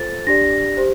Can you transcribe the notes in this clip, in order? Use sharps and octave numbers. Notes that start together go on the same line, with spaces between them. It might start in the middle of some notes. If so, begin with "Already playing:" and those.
Already playing: F4 A4 C5 A6
D4 G4 D5 A#6
G4 C5